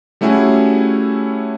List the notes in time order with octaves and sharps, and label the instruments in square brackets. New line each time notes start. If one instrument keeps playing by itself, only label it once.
[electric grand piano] G3 A3 C#4 E4 F#4 G#4